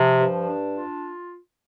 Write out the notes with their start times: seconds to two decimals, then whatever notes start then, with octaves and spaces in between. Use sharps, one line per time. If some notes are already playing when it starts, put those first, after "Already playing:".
Already playing: C3 F3
0.20 G2
0.48 D4
0.74 F4